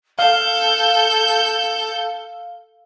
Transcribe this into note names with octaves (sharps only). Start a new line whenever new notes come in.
A4 F5 G6 G7